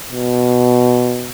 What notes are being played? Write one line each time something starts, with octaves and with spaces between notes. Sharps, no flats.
B2